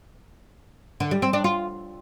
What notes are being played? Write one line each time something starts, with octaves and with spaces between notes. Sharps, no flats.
D3
G3
C4
D4
F4